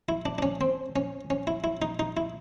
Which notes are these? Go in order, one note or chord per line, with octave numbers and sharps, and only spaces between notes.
E4
D4
D4
C#4
C4
C#4
C#4
E4
E4
D#4
D#4
E4